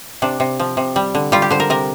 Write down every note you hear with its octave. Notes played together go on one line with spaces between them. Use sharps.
C3 D4
C3
F3
C3
G3
D3
G3 F4
G4
D3 C5
A#4
C3 A#4